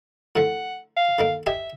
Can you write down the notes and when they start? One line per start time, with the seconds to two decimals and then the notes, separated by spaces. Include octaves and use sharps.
0.36 A2 D3 F3 F#5
0.97 F5
1.19 D3 D#3 A#3
1.46 G4 D#5 E5 G#5